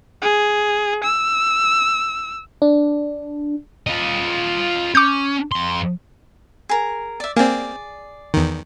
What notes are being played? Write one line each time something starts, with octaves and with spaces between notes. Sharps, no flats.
G#4
E6
D4
F4 D#5
C#4 D6 G6
F2 C6
G#4 A#4
D5 E5
A#3 C4 G#4 D5
E2 D#3